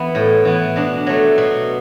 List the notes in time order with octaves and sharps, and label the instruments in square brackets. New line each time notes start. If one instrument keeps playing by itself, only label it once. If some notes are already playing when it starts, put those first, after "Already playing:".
Already playing: [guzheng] E3 B3 E4
A2
E3 B3
B2 D4
F#3 A3
B2